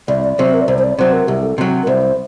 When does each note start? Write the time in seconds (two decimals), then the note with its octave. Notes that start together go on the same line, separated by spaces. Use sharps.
0.08 C2 D5
0.24 D5
0.39 C3 F#3 C5
0.54 A#4
0.61 D5
0.68 C2 C5
0.78 C5
0.84 D5
0.98 C3 F#3 C5
1.13 A#4
1.27 C2 G4
1.43 A4
1.58 C3 F#3
1.83 A#4
1.87 C2 C5